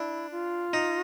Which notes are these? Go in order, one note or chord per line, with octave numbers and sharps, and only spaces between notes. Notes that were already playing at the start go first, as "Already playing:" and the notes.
Already playing: D4 E4
F4
D#4